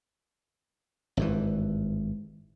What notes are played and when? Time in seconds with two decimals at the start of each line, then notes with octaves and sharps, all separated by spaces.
1.17 G#1 G2 E3